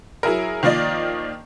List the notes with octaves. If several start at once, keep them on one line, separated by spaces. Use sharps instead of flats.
F#3 E4 G#4 A#4
D#3 F3 A#3 F4 D5 D#5